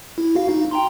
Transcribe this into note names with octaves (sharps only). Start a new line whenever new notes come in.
E4
F#4 F5
D#4
G5 A#5 C6